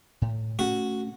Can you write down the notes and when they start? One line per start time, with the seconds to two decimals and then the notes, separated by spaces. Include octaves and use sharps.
0.22 A2
0.59 A3 C#4 F#4